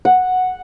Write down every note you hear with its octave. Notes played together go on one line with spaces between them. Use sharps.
F#5